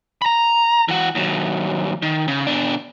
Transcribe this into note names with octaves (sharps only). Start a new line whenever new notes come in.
A#5 B5
E3 F#4
D#2 F#3
D#3
C#3
B2 D4